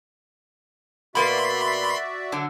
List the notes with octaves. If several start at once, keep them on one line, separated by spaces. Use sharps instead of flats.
B2 A#3 F#4 B4 D5 E5 B5 C6
D3 F#3 D4